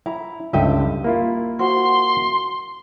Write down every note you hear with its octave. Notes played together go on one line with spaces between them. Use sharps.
E4 A#5
C#2 G2 D3 D#4 G4 E5
A#3 E4 F4
F#4 C5 C6